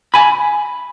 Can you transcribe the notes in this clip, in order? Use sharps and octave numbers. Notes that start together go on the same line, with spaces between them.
G#5 B5